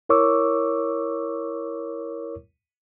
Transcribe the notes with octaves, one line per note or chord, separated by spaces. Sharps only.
E4 A#4 C#5 C#6 D6 E6